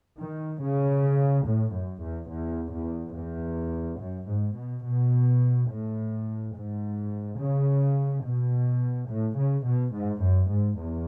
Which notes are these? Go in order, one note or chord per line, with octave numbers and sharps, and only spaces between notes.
D#3
C#3
A2
F#2
E2
E2
E2
E2
F#2
G#2
B2
B2
A2
G#2
C#3
B2
A2
C#3
B2
G#2
F#2
G#2
E2